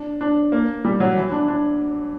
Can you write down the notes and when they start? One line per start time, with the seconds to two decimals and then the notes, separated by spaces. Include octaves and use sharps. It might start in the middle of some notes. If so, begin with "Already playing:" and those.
Already playing: D4
0.21 D4
0.52 A#3
0.85 G3
1.00 F#3
1.17 E3
1.32 D4
1.48 D4